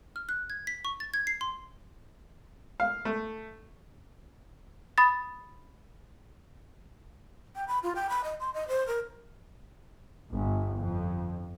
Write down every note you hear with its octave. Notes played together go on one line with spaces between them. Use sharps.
F6
F#6
G#6
B6
C#6
A6
G#6
C7
C6
F5
A3
B5 D#6 A6
G5
B5
F4
G5
B5
D#5
C6
D#5
C5
A#4
G1
F2